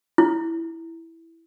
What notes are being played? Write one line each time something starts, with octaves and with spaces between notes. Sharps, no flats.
E4